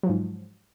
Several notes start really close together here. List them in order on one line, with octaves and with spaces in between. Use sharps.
F#3 F3 G#2